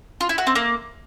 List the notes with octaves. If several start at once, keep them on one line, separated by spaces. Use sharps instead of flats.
F4
E4
F#4
C4
A#3